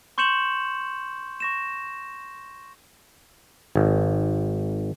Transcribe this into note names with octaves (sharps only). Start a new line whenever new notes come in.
C6 C#6 G6 C#7 E7 F#7
C#6 A#6 E7
G#1